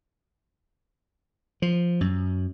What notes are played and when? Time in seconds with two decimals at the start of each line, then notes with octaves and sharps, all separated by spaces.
1.62 F3
2.01 F#2